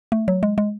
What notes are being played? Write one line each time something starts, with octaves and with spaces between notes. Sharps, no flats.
A3
F#3
G#3
G#3